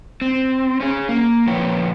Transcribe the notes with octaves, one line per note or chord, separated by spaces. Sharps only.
C4
C#4 G#4
A#3
A#2 F3 E4 B4 C#5 G5